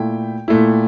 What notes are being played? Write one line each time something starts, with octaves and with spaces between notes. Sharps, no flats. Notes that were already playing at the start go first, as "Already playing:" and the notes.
Already playing: A#2 A3 E4 G5
A#2 A3 E4